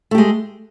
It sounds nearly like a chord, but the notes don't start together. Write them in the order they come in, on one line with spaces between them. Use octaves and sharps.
A3 G4 G#3